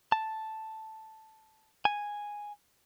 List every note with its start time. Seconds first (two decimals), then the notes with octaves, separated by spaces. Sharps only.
0.12 A5
1.85 G#5